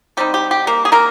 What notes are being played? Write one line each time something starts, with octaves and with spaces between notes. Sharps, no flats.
C3 G3 C4 D#4 G4
G4
G4
A#3 A#4
G#4
A#3 A#4